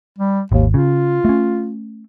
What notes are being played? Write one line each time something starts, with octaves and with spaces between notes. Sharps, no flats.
G3
G#1 D#2
C#3 F4
A3 C#4